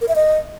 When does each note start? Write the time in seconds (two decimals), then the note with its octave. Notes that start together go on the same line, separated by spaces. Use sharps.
0.01 A#4
0.08 E5
0.15 D#5